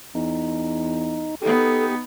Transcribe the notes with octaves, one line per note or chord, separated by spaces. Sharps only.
E2 D#4
B3 D#4 G4 A4